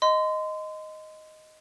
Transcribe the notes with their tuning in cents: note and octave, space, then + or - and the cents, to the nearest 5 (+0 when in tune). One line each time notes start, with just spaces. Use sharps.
D#5 +0 C6 -30